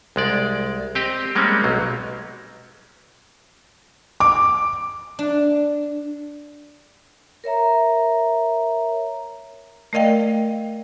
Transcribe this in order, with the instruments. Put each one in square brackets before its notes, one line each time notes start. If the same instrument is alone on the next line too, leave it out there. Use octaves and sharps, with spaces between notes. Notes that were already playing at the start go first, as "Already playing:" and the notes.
[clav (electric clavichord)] C2 G#3 D5
C4 G4 D#5
G3 G#3 A#3 C4 C#4
B1 F#3
[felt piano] D6
[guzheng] D4
[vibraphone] A#4 C#5 E5 A#5
[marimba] A3 A#4 D5 D#5 F5 G5